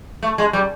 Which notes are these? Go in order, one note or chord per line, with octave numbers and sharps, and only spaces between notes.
A3
G#3
G3